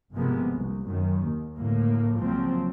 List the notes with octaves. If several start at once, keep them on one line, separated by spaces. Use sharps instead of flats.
G1 C3 F3 G#3 A#3 B3
C2
F#2 D#3
D#2
D2 A2 A#3
C#2 A#2 F3 F#3 C4